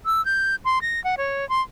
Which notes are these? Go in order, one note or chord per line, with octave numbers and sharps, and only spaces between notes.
E6
G6
C6
A#6
F#5
C#5
C6